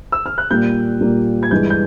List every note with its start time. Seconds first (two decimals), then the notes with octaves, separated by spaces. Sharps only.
0.12 E6
0.26 F6
0.38 F#6
0.51 A#2 G3 A#3 G6
1.01 A#2 G3 A#3
1.43 G#6
1.51 G2 E3 G#3 G6
1.70 G6